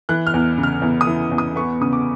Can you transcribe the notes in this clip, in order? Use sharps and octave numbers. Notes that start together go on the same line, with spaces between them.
E3 F#6
F6
E2
C#3
F6
E2
D#6
E3
E2
D#6
B3 C#6
C#3 D#6
D6